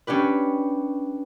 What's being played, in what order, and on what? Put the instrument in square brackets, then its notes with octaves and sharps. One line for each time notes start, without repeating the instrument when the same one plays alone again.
[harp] C#4 D4 G4 B4